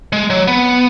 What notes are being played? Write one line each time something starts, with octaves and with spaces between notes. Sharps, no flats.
G#3
F#3
B3